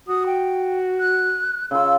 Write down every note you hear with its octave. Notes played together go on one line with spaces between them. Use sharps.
F#4 D#6
G5
F#6
C#3 F4 E6